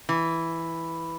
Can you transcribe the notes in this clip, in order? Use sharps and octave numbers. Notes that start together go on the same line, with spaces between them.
E3